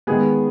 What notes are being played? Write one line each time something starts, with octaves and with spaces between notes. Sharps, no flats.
D#3 G#3 B3 G#4